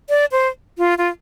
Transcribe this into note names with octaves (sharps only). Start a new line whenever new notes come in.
D5
C5
F4
F4